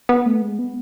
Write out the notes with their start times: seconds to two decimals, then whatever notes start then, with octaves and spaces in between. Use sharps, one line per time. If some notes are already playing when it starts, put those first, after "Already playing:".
0.09 B3
0.26 A3
0.42 G#3
0.59 B3